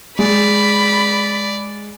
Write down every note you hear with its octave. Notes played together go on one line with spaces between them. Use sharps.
G#3 D5 B5